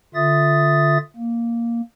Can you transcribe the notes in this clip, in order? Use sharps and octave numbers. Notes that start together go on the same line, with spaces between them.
D3 F4 E5 D#6 A6
A#3